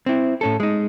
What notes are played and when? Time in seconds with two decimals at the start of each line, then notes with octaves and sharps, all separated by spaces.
0.06 C4 E4
0.41 A2 C#4 A4
0.60 G#3 D#4